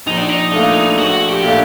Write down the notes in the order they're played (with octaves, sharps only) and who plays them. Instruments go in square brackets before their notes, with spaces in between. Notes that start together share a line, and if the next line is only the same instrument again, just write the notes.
[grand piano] A#1 [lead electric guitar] D#4
[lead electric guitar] D4
D#4
[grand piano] A#2 A3 D4
[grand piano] A#1 [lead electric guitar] F#4
[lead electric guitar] G4
[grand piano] A#2 A3 D4